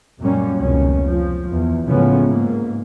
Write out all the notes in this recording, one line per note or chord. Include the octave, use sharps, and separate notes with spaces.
F#2 A#2 G3 A#3 C#4
F1 C#2 B2 D#3 C#4
F3
E2
A2 C#3 F3 G#3 B3 C#4
G#2 A#3